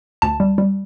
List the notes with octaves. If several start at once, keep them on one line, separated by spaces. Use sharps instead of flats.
D2 A5
G3
G3